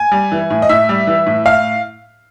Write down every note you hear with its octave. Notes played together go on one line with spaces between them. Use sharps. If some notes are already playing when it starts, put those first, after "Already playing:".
Already playing: G#5
G3
E3
A2
D#5
A2 E5
G3
E3
A2
A2 F5